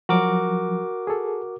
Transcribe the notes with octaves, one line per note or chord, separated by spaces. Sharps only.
F3 F#3 F#4 A#4 D6
G#4 A4